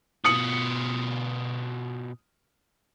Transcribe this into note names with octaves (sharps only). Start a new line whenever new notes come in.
B2 F4 D#6 C#7 F#7